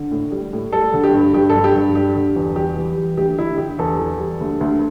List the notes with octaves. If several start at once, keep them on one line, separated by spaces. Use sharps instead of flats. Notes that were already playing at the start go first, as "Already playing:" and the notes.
Already playing: D3
A2
G3
A2
G3 A4
D3
G4
G2
G2 G4
A4
G2
G4
G2
G3 G4
D3
E2
G3 G4
E3
G3
D2 G4
D2 E4
D3 G4
E2 A4
E3
G3
D2
D2